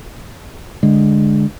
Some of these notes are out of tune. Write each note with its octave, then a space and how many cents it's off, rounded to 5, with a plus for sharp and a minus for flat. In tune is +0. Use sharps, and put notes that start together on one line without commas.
D3 +0 G#3 +0